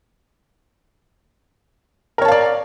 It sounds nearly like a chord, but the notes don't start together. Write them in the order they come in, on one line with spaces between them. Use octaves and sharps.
A#4 C#5 A5 F5 D5